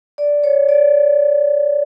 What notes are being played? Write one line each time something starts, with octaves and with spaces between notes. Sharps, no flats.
D5
C#5
D5